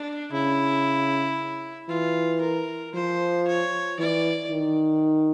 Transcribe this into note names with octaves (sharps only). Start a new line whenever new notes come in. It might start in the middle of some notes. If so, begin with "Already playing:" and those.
Already playing: D4
C#3 E4
E3 F4
A#4
F3 C5
C#5
E3 D5
D#3